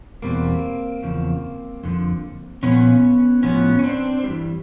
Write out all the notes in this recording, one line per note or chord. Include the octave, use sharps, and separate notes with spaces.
E2 B2 G3 A#3 C4
E2 C#3 F3
F2 D3 F3
A#2 F3 B3 C#4
A2 F3 B3 C#4
C#4
C4 D4
G2 E3 G3